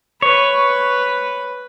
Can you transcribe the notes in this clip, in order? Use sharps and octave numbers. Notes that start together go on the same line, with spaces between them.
B4 C#5